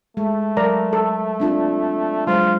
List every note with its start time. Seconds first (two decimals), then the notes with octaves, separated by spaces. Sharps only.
0.17 G#3 A3
0.57 F#3 A#4 D5 A#5
0.93 A4
1.40 C4 D4 F4
2.27 F#3 G#3 F4 C5